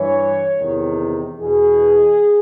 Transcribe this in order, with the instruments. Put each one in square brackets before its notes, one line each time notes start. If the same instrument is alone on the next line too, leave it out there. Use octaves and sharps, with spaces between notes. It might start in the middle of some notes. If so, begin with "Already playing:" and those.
Already playing: [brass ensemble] G2 E3 C#5
E2 C3 D#3
E2 B2 G#4